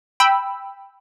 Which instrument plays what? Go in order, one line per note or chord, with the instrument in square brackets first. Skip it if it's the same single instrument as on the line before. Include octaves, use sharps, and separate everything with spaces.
[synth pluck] G5 B5 E6